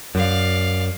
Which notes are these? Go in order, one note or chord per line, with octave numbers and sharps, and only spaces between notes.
F#2 D5 F5